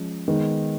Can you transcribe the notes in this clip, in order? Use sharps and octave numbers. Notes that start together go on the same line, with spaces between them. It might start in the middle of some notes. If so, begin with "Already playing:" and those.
Already playing: F3 G#3 C#4
D#3 G#3 B3